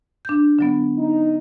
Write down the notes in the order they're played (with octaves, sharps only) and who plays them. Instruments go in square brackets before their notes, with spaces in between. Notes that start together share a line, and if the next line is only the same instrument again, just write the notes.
[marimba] D4 G6
D3 F#3 B3
[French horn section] D#4